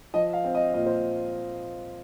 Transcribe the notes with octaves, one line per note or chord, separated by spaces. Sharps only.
F3 D#5
F5
C4
D#5
A#2 D#5
C5